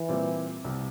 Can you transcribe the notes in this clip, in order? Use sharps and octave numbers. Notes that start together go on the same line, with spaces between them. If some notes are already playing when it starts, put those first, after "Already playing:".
Already playing: E3
A#2 G3 C4
C2 C3 G3